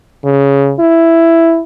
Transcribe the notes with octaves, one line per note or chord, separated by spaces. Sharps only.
C#3
E4